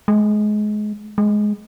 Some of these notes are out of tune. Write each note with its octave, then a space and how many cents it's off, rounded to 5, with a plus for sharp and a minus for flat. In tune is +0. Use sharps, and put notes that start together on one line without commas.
G#3 +25
G#3 +10